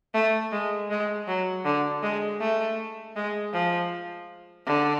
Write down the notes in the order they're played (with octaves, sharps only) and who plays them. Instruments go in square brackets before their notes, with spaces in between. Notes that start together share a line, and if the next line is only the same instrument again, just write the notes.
[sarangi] A3
G#3
G#3
F#3
D3
G#3
A3
G#3
F3
D3